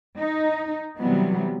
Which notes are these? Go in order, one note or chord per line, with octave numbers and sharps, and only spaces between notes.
D#4
C3 E3 F#3 G3 B3